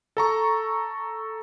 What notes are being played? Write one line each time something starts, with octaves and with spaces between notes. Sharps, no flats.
A4 A#5 C#6